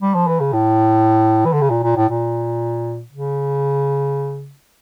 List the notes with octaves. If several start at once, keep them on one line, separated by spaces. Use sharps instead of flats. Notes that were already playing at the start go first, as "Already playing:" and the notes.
G3
F3
E3
C#3
A2
E3
D3
C#3
A#2
A#2
A2
A#2
C#3